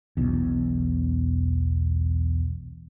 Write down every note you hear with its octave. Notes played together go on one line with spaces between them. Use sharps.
E1 B1 E2